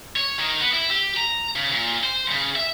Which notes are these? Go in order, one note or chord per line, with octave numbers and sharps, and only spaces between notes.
C#5
D#3
B3
E4
G4
A#5
C#3
A#2
C5
C#3
E5